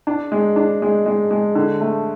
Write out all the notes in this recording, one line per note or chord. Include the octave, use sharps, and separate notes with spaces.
D4
G#3
D4
G#3
G#3
G#3
D3
A3